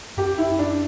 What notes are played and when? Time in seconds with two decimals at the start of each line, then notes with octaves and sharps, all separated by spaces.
0.17 F#2 G4
0.38 E4
0.59 D4